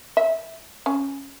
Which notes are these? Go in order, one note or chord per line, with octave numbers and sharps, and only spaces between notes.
E5
C#4